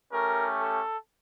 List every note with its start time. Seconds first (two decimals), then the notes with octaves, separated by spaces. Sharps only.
0.11 A3 C#4 G4 A#4
0.60 A4